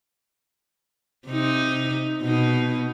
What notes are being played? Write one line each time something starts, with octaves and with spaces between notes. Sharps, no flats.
C3 D#4
B2 D#4